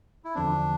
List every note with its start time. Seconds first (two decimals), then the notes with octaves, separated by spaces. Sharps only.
0.24 E4
0.35 E2 D3 F3 C4 D4